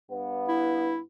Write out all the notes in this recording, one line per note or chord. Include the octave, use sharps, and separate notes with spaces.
G2 B3
E4